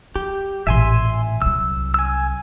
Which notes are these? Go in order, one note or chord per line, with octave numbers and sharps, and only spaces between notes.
F#3 G4
A1 A#2 E5 G#5 C6
C2 F#3 E6
G#5 E6